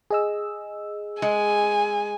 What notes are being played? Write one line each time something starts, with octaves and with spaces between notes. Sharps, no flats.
G#4 D#5 E6
G#3 G#5